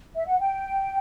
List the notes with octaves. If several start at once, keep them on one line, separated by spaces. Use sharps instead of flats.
E5
F#5
G5